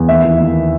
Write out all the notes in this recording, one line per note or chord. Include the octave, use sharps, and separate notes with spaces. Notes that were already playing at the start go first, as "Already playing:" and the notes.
Already playing: E2
D#2 E5
E3
D#2